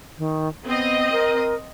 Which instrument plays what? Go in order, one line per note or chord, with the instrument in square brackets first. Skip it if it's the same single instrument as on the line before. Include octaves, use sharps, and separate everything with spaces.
[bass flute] D#3
[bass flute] B3 [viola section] C4 D#5
[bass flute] A#4